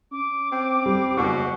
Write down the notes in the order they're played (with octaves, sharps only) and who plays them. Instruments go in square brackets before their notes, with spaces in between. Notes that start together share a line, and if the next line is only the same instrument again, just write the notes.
[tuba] C#4 [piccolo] D6
[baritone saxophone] C4
[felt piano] G3
[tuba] F#1 [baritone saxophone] B2 [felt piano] C#6